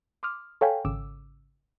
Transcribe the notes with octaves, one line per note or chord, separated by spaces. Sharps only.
C6 D6 D#6 F6
A4 C#5 F5 G5 G#5 B5
G#1 C#3 D6 E6